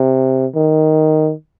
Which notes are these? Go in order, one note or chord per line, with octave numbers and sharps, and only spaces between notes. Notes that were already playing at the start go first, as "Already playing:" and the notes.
Already playing: C3
D#3